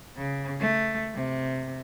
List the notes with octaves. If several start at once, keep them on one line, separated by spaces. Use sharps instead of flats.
C#3
A3
C3